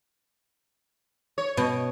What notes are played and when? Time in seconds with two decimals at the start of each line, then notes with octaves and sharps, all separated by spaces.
1.38 C#5
1.57 B2